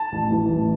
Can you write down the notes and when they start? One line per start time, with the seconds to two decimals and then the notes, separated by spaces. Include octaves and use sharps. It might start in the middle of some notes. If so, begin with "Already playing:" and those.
Already playing: A5
0.12 A1
0.31 E3
0.49 A1